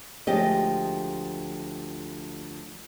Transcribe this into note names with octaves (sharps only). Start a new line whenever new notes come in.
D2 F3 G#3 G4 D#5